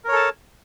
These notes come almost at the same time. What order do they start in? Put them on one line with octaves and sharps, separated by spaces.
A#4 C#5 A4 A5